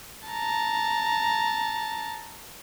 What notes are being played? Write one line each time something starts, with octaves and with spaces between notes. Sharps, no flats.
A5 A#5